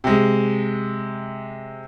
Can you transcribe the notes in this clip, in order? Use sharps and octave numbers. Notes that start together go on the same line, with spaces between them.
C3 G#3